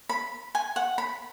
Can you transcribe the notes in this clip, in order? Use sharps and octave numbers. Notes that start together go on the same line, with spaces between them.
B5
G#5
F#5
B5